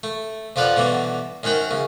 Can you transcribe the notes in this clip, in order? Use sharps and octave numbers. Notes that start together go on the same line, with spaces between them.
A3
F2 F3 F4 B4 D5 F#5
B2 D3 E3 G3
F#2 D#3 C4 F#5 G5
F#2 C#3